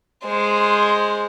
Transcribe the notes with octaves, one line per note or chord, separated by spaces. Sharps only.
G#3 C5